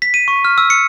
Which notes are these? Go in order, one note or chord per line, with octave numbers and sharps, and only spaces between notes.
B6
D#7
C#6
F6
E6
C#7